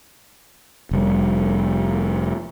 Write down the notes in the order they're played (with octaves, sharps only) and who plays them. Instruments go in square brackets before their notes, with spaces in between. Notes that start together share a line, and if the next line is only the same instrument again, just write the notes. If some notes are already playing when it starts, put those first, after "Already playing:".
[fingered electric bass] F1 G3